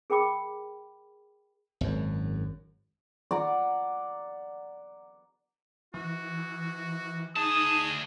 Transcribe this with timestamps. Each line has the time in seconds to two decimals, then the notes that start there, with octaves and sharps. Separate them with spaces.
0.10 G#4 A#4 G5 B5 D6
1.81 G#1 F#2
3.31 D5 F#5 A#5
5.94 E3 F#4
7.37 D2 D#4 G#4 A5 D#6